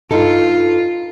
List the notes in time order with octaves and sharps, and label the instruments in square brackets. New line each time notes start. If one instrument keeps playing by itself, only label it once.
[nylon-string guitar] G2 D#4 A4 [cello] F4